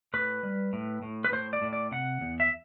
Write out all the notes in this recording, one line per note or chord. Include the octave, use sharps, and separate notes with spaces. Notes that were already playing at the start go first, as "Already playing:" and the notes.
A2 B4
G3
A2
A2
B4
A2 C5
D5
A2
D5
C3 F#5
E2
E5